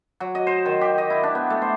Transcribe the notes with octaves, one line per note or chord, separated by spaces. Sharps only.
F#3
D#5
C5
D#3
G4
D#5
E4
D4
B3
A3
C5